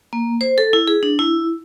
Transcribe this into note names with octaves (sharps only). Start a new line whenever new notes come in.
A#3
C5
A4
E4
G#4
D4
E4